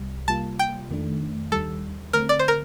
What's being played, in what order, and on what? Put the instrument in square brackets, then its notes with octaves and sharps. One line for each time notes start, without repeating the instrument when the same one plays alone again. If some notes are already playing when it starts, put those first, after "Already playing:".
Already playing: [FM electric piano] C2 C3 G3
[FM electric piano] C3 G3 A#3 F4 [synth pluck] A5
[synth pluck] G5
[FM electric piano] F2 D#3 A3 D4
[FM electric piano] D#2 D#3 G3 [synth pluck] A4
[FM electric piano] D3 A3 C4 [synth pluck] A#4
[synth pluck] D5
C5
A#4